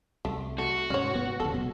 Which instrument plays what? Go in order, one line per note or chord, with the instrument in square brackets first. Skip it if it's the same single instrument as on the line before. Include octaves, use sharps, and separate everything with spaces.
[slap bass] C2 [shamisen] A3
[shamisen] A3 [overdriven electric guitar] F#4
[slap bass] G#2 C3 G#3 [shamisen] C#4 C#5
[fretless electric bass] B3
[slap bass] D1 C#3 E3 [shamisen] A4
[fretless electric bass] B2 [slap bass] F#3